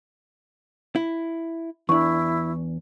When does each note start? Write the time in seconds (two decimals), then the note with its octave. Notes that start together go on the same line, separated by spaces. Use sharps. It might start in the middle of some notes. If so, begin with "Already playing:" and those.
0.96 E4
1.89 E2 D4 E4 C#6